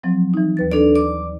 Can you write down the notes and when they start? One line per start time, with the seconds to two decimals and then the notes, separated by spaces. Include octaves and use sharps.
0.03 F3 F#3 C4
0.34 E3 D#4
0.57 D#2 B4 A6
0.72 D4 A4 D5
0.95 D5 D6